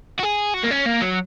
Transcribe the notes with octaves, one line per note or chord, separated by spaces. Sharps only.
F#4
G#4
F#4
A#3
C#4
A#3
F#3